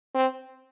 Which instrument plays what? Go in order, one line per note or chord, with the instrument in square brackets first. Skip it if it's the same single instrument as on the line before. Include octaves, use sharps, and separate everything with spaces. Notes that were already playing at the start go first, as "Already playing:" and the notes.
[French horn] C4